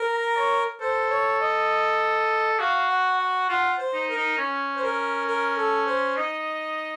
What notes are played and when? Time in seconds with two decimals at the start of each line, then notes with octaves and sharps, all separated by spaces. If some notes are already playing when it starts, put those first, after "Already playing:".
Already playing: A#4
0.13 A#5
0.37 C#5
0.81 A4 C5
1.10 C#5
1.41 D#5
2.59 F#4 F5
2.89 F#5
3.19 F#5
3.49 F4 F#5
3.78 C5
3.94 D#4
4.09 A#4
4.16 D#4
4.38 C#4
4.76 C5
4.83 A#4
5.27 A#4
5.57 A4
5.87 C5
6.17 D#4 D#5